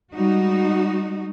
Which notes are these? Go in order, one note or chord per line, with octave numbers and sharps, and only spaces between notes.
G3 G#3 D#4 F#4